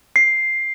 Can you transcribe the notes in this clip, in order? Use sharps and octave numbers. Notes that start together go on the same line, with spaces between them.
C7